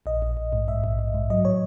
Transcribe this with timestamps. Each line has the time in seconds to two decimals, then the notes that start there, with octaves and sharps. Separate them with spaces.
0.06 A#1 D#5
0.22 A#1
0.37 A#1
0.53 G#2
0.68 G#2 E5
0.84 A#1
0.99 A#1
1.14 G#2
1.30 F#3 D#5
1.45 A2 C#5